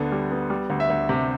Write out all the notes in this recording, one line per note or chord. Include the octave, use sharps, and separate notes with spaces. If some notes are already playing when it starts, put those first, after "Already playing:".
Already playing: D2 D3 B3
G3
B3
G3
D2
E5
D2
C3